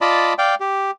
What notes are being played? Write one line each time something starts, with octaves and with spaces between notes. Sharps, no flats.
F4 D5 D#5 A5 B5
D5 F5 G5
G4